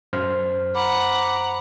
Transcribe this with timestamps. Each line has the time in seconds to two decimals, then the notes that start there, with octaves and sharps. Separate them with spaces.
0.13 F#2 C5 F6
0.75 F#5 A#5 B5 D6